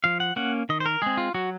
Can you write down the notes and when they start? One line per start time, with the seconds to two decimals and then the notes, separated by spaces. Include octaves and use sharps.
0.04 F3 F5
0.20 F#5
0.36 A#3 C#4 F#5
0.69 D#3 D#5
0.80 C5
0.86 A#4
1.02 G#3 C4 G#4
1.17 F4
1.34 F#3 F#4